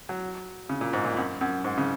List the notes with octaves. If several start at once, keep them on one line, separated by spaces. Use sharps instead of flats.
F#3
C#3
A#2
G#2
A#2
F#2
F#2
G#2
C#3